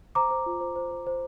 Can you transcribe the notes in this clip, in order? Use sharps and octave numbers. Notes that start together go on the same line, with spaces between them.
C5 A#5 D6
C5
F4
C5
C5
C5
C5